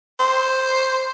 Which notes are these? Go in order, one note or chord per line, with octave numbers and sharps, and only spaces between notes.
C5